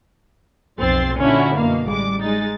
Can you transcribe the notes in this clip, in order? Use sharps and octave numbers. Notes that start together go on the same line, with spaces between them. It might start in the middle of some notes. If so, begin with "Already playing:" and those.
B1 F2 C4 C6 A6 C7
A#2 D3 C#4 D4 E4 F#4
F#2 B2 A#3 F5
A1 G3 G#3 D6
G#3 D#4 A6